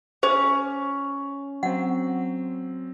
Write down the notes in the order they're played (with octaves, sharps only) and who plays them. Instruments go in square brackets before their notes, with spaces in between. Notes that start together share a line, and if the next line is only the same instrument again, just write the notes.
[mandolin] C#4 [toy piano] G#4 C5
[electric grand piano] F#3 C4 [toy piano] F#5